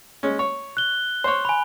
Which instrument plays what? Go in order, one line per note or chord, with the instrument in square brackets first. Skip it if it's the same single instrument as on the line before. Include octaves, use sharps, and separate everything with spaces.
[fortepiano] G#3 C#4
C#5
[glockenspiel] F#6 G7
[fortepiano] C5 C#5
[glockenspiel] G#5 B5